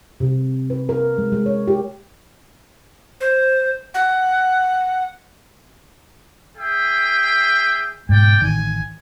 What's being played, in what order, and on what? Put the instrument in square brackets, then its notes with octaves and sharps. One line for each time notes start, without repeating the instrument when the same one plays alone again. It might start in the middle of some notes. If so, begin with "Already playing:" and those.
[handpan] C3
B4
A#4
G#3
G#3
C#5
G4
[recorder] C5
F#5
[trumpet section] G#4 E5 G5
[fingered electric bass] G#2 B2 [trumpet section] D5 G5
[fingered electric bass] A1 D#3 [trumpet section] G#5